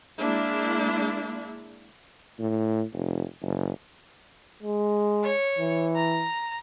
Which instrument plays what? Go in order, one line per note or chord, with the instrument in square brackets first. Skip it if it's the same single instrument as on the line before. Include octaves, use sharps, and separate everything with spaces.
[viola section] G#3 A#3 D4 E4
[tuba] A2
F1
F#1
[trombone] G#3
[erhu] C#5
[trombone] E3
[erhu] A#5